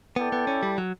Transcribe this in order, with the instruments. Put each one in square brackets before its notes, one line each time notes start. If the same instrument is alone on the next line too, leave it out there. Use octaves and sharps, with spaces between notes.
[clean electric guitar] B3 [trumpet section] E4 A4 D5 G5
[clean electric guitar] B3
C#4
G3
F#3